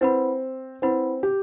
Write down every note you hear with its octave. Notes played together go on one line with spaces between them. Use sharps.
C4 E4 B4 F#5 B5
C4 E4 B4 F#5 B5
G4